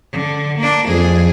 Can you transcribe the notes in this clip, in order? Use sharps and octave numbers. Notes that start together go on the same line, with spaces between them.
D3
A#3 D4
F2 G#4